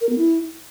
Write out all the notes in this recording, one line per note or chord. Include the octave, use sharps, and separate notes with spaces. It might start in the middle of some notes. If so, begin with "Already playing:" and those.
A#4
B3
E4